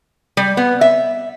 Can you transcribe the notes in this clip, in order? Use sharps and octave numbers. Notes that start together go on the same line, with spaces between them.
G3
B3
E5